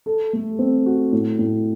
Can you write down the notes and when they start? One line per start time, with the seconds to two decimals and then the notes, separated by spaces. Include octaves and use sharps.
0.06 A4
0.33 A3
0.59 C4
0.86 F#4
1.13 A2
1.39 A2